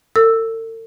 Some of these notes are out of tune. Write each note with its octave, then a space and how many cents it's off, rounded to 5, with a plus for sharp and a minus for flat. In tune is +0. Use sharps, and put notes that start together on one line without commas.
A4 +45 E6 +0